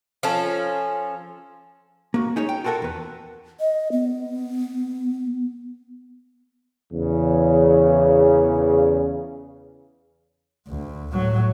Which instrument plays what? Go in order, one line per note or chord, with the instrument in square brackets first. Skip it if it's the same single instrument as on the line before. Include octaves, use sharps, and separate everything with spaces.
[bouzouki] F3 C#4 A4
[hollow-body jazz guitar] A#3 F#4
C#4 D#4 G#4 C#5
G5
F4 F#4 A4 A#4 F#5 A5
E2 B4
[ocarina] D#5
B3
[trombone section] E2 C#3
[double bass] D2
A2 F#3